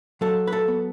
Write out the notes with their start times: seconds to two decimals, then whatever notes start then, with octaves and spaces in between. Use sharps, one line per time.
0.21 F#3 A4
0.47 B4
0.53 A4
0.68 B3